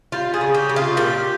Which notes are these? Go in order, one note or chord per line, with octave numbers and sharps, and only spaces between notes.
G3 F4
G#4
C#3
G4
C#3
F4
A#2 G4